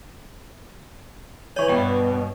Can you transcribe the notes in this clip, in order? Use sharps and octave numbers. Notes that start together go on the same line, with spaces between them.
E3 C#5 G#5 C#6
G2 B2 G5